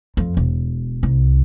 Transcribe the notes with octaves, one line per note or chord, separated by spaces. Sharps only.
F2
E1
C2